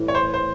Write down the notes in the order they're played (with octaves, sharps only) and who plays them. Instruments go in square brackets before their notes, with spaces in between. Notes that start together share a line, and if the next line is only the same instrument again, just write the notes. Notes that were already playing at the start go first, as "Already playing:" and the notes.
Already playing: [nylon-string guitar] A2 E3 G3
[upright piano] C#5
C5
C5